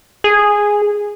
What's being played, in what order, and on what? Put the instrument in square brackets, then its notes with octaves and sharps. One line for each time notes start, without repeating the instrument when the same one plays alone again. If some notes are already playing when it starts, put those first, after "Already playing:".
[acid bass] G#4